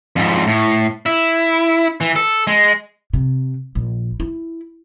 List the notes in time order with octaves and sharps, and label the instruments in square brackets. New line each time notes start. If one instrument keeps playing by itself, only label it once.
[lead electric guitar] F2 G#2
A2
E4
E3
A4
G#3
[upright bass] C3
A#1
E4